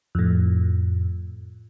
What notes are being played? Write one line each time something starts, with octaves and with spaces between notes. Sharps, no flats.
F2 A2